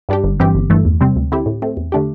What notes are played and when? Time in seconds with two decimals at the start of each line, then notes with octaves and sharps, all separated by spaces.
0.09 G2 G3 D4 G4
0.24 G1
0.40 G2 E3 C4 G4
0.55 G1
0.70 G2 E3 A3
0.85 E2
1.01 C3 G3 C4
1.16 D2
1.32 D3 C4 E4 G4
1.46 A2
1.62 A3 C4
1.77 E2
1.92 D3 A3 D4 G4